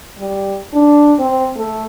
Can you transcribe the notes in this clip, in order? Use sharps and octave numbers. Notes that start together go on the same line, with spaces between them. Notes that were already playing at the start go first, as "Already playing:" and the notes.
G3
D4
C4
A3